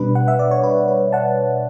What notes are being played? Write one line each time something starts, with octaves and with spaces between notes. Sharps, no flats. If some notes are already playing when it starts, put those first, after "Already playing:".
Already playing: B2 G3 D4 B4
F#5
E5
D5
C#5
B4
B4
F#5 A5